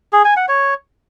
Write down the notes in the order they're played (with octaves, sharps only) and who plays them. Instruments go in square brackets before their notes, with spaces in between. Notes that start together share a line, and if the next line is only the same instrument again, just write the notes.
[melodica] G#4
G#5
F#5
C#5